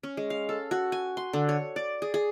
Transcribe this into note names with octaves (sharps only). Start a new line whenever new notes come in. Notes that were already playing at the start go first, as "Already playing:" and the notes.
C#4
G#3
F5
A4
F#4
G#5
C6
D3
C#5
D5
G#4
G#4